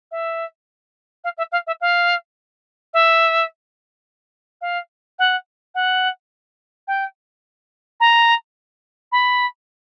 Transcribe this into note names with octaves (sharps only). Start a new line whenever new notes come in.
E5
F5
E5
F5
E5
F5
E5
F5
F#5
F#5
G5
A#5
B5